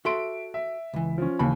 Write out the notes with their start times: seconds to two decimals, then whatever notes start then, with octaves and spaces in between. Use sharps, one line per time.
0.05 F#4 A4 E5 C6 D7
0.54 E5
0.94 C#2 E3
1.18 F3 C#4
1.39 D#2 C#3 E3 B5